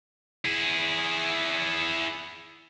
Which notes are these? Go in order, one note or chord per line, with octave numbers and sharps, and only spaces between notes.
E4 G#4